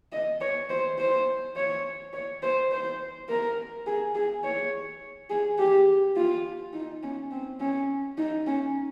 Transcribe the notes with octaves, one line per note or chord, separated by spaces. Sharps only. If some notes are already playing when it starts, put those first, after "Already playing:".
D#5
C#5
C5
C5
C#5
C#5
C5
C5
A#4
G#4
G#4
C#5
G#4
G4
F4
D#4
C#4
C4
C#4
D#4
C#4